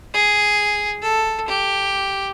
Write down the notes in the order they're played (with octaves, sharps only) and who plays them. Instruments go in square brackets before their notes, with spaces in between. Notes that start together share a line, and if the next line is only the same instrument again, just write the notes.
[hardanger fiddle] G#4
A4
G4